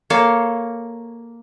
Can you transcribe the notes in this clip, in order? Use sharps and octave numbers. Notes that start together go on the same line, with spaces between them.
A#3 A4 C#5 F5